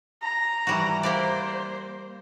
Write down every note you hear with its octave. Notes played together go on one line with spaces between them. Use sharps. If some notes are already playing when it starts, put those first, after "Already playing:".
A#5
E3 G3 F#4
A#3 G4 C5 D5